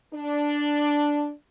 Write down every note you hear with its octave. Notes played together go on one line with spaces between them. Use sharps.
D4